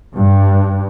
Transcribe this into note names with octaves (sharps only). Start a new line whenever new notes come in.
G2